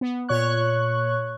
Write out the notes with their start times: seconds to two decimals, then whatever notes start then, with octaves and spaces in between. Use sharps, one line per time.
0.01 B3
0.29 A#2 C#5 C#6 F#6